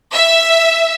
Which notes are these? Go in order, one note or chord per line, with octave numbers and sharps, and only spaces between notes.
E5